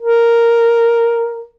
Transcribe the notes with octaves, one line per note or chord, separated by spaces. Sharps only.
A#4